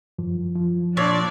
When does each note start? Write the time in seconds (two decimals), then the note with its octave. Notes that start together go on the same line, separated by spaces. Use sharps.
0.19 F#2 F3
0.55 F3
0.97 A#2 D4 C#5 D5